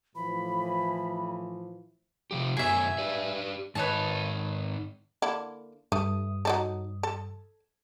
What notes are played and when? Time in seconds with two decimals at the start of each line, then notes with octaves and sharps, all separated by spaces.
0.15 A2 E3 F3 B5
2.31 C3 F3 G4
2.57 F#2 B2 F#3 G#4 E5
2.98 G4 B4 D5
3.75 G#2 D#3 B3 D#4 C#5 A5
5.22 D3 A#3 E4
5.92 G2 A3 D#6
6.45 F#3 D#4 A4
7.03 A4